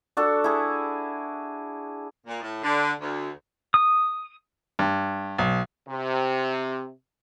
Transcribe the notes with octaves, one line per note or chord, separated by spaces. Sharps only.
D4 F#4 A4
E4 G#4
A#2
A2
D3
D2
D#6
G2
B1
C3